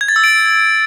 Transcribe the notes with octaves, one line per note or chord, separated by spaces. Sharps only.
G#6
A6
E6
D7